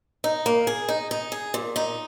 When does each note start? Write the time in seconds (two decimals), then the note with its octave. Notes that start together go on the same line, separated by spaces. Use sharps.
0.24 D#4
0.46 A#3
0.67 G#4
0.89 D#4
1.11 D#4
1.32 G#4
1.54 A#2
1.76 D#4